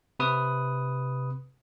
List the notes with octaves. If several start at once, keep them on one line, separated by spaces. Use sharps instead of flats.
C3 B4 D#6